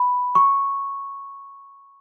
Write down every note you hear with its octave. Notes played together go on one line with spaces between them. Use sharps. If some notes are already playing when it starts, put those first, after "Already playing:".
Already playing: B5
C#6